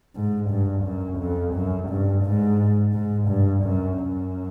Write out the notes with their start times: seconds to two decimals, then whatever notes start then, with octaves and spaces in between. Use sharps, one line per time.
0.15 G#2
0.50 G2
0.84 F#2
1.19 F2
1.54 F#2
1.89 G2
2.25 G#2
2.93 G#2
3.29 G2
3.64 F#2
3.99 F#2